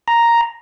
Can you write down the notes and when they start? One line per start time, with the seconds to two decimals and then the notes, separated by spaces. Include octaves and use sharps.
0.08 A#5